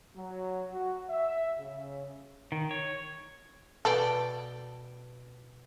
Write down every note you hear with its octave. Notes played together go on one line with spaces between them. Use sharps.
F#3
F#4
E5
C#3
D#3
C#5
B2 A4 D5 G5